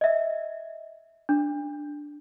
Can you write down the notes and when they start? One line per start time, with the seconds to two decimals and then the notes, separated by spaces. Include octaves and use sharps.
0.01 D#5 E5
1.29 D4